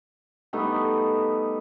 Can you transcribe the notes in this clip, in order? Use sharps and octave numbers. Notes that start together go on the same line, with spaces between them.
G3 A3 B3 D#4